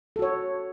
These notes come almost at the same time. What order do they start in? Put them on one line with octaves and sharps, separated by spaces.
A4 F#4 C#5